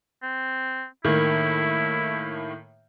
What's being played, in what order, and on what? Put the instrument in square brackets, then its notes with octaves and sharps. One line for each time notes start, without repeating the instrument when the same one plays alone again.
[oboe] C4
[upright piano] A2 D#3 A#3 [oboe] E4